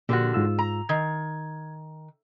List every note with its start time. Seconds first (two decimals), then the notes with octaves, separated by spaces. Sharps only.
0.09 A#2 D3 F3 F#4 G4
0.34 G#2 F4 E6
0.59 A#5
0.89 D#3 G#6